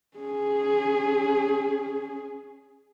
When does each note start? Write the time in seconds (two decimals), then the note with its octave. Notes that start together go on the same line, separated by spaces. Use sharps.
0.17 C#4 G#4